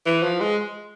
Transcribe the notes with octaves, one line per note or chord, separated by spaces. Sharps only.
E3
F3
G#3